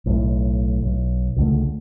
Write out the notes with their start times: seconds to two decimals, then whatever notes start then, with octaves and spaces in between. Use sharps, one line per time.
0.06 B1 A2
0.82 B1
1.36 C#2 D3 A3